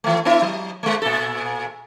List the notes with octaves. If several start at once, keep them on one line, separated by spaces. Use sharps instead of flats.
E3 A3
B3 E4 E5
F#3
G#3 A3
A#2 A4